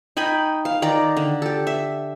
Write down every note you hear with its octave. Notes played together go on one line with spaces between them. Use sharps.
D#4 G5 G#5 B5
F5
D#3 D5 A#5
D3
G4 A4
E5